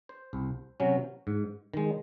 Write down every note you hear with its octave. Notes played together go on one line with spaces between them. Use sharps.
C5
C2
C3 F#3 C#4
G#2
D#3 G#3